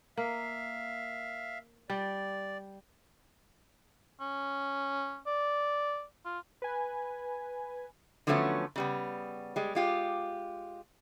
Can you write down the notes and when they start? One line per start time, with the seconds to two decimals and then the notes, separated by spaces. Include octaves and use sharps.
0.17 A#3 E5 F5
1.90 G3 D5
4.20 C#4
5.27 D5
6.25 F4
6.62 B4 G#5
8.27 D3 F3 F#3 A3 B3 C#4
8.76 C#3 G3 B3
9.56 G3 G#3
9.75 G#3 F4 G4